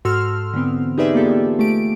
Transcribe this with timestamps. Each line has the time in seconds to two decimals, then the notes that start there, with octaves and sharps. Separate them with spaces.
0.05 G#2 F#4 A4 C6 E6 F6
0.54 D3 E3 B3 C4
0.98 D#4 G4 G#4 B4 D5 E5
1.14 A#3 B3 F4 G4 A4
1.59 A3 G4 D7